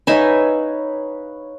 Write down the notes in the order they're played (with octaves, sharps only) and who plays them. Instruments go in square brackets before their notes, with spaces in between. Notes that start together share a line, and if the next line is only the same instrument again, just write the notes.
[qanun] D#4 E5 G#5 [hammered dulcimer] B4 C#5 F5